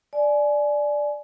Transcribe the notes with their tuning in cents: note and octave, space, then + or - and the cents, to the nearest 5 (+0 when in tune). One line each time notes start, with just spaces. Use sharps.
D5 +0 G#5 +25